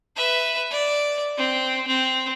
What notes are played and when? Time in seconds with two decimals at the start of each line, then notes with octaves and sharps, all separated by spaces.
0.16 B4 E5
0.71 D5
1.37 C4
1.87 C4